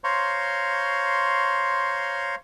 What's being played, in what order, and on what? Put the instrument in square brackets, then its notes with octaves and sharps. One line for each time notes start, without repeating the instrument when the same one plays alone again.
[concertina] C5 C#5 F5 A#5 C6 C#6